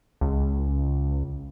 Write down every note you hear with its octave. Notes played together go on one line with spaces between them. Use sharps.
C#2